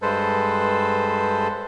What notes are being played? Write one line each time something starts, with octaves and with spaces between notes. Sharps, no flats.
G2 G#3 A4 B4 C5